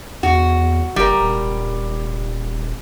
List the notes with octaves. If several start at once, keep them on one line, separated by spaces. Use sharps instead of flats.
E2 F#4
F#1 G3 A#4
D#1